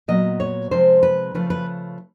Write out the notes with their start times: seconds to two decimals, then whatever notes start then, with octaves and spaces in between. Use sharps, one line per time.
0.08 A#2 F#3 B3 D#5
0.40 C#5
0.71 C3 F3 G#3 C4 C5
1.03 B4
1.35 C#3 F3 A3 B4
1.50 B4